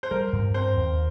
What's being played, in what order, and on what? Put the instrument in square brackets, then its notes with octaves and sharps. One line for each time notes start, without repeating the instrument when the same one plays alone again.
[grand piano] C5
[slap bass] G3 [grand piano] A#4
[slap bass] G2
[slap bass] C4 [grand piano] C5
[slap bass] D#2